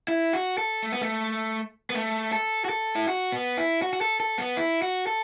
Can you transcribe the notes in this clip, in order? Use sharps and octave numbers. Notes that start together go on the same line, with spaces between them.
E4
F#4
A4
A3
B3
A3
B3
A3
A4
F#4
A4
E4
F#4
B3
E4
F#4
F#4
A4
A4
B3
E4
F#4
A4